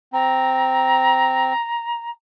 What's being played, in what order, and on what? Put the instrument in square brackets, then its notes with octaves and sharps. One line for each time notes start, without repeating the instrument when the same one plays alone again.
[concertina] C4 [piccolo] A#5